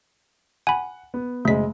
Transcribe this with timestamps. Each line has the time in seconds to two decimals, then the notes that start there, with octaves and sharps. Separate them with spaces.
0.67 F#5 G#5 B5
1.14 B3
1.45 F#1 C#3 G#3 A3 B6